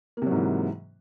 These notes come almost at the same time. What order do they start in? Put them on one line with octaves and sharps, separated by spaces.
A#3 C3 F#3 G#2 E3